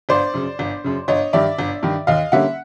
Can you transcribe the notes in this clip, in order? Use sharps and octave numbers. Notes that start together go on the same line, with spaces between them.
G1 C5 D5
F#2 C#3
G1
F#2 C#3
G1 C#5 D#5
G2 D#3 D5 E5
G1
G2 D#3
D#2 D#5 F5
D3 G3 A#3 C#4 E5 F#5